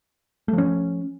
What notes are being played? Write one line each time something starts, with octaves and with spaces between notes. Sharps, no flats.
F3 A3 C#4